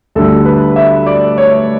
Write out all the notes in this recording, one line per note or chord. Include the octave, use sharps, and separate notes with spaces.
D2 D3 G3 A4
B4
E5
D5
C#5